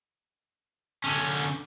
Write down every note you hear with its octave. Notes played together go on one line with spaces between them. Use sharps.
D3 C#4